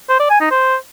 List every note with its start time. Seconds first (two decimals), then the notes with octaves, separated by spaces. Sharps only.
0.09 C5
0.20 D5
0.30 G#5
0.41 D#4
0.51 C5